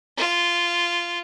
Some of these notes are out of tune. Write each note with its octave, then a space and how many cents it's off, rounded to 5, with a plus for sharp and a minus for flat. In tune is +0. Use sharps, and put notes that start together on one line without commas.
F4 -10